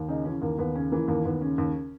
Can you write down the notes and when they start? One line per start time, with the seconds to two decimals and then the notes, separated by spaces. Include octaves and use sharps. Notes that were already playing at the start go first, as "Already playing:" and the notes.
Already playing: D#2
0.08 C#3 D#4
0.25 E3 C#4
0.42 D#2 A#3
0.59 D#2 B3
0.75 C#3 C#4
0.92 E3 A#3
1.08 D#2 A#3
1.25 D#2 B3
1.41 C#3 C#4
1.58 D#2